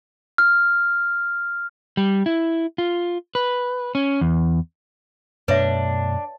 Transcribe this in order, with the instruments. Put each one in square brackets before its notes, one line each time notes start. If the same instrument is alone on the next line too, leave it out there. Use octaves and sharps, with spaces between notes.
[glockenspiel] F6
[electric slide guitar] G3
E4
F4
B4
C#4
E2
[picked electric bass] F#2 B2 A3 [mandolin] D4 [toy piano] B4 C#5 E5